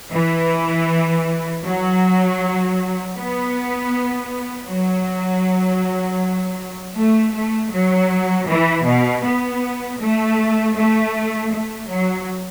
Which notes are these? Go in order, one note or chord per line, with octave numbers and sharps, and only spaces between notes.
E3
F#3
B3
F#3
A3
A3
F#3
E3
B2
B3
A3
A3
A3
F#3